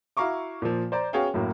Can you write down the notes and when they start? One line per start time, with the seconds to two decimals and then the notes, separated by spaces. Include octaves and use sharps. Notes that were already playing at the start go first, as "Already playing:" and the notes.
0.17 E4 F#4 F5 A#5 C#6 D6
0.62 A#2 F3
0.92 C5 D5 A#5
1.13 B3 C#4 F#4 G#4 F5 G5
1.34 F#2 A2 F#3 A#3